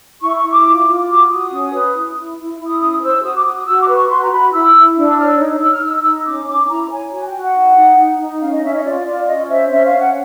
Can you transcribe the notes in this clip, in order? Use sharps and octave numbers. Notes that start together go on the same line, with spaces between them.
E4 C#6
C#6
E4
D6
F4
F4
F#4 D6
F#4 D#6
C#4
B4
E4
E4
E4
E4
D#6
C#4 D#6
C5 E6
F#4 D#6
D6
F#4 D#6
D#6
F#4 E6
D6
B4
C#6
F#4 C6
A#5
F#4 B5
E4 E6
E4
D4 E6
E6
C#5 F6
E6
D#4
D#4 E6
F6
D#4 E6
D#4
C#4 D6
C#4 D6
E4 A#5
C#5 G#5
F#4 G#5
G5
F#4
F#5
D#4
D#4
D#4
D#4
C#4 F5
D#5
C#4 E5
D#5
F4 D5
F4 D5
C#4 D#5
C5 E5
C#4 E5
F5
C#4
F#5